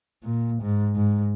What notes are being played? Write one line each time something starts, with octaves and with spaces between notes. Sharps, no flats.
A#2
G#2
G#2